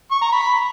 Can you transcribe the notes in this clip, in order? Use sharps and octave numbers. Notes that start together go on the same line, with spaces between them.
C#6
A#5
B5